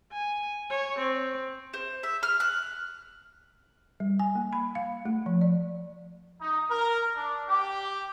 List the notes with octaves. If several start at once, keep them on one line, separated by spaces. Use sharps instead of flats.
G#5
C#5
C4
C5
E5
F6
F#6
G3
G#5
A#3
B5
F5
A3
F3
D5
D#4
A#4
D4
G4